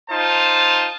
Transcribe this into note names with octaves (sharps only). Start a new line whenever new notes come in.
D#4 F4 C5 A5